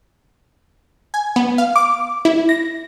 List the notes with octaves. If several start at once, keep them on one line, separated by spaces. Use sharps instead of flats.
G#5
B3
F5
D6
E4
A#6